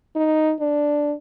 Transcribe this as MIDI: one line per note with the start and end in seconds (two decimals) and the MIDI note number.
0.16 0.53 63
0.60 1.13 62